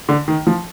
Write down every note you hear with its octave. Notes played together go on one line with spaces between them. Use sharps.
D3
D#3
F3